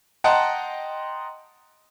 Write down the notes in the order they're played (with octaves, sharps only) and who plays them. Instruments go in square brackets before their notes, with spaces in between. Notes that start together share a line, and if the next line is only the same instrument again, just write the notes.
[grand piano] D#5 F#5 G5 A5 A#5 C6